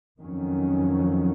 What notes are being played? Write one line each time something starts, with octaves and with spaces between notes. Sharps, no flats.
F2 D#3 F#3 C#4